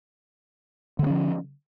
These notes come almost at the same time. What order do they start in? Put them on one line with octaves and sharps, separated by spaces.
D3 A3 C#4 F3